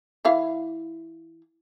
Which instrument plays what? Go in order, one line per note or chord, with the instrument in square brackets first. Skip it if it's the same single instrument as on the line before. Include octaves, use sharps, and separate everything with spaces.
[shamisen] E3 E4 F5